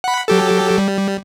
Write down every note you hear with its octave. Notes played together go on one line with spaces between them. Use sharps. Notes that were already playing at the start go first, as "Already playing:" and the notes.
F#5 B5
F#3 G4 A4
G3